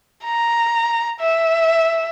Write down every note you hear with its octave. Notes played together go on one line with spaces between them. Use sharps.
A#5
E5